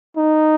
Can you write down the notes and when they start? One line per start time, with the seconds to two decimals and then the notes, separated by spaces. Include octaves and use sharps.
0.17 D#4